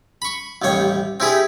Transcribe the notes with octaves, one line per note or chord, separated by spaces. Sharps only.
B5 C#6
A1 D#2 G3 C#5
C4 D4 E4 G4 G#4